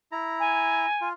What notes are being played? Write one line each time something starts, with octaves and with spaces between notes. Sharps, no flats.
E4 A#5
G#5
F4